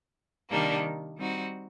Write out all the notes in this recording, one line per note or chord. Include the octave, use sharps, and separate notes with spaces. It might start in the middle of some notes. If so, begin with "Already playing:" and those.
C3 D#3 G3 A#3 D4
G3 C4 D#4 F#4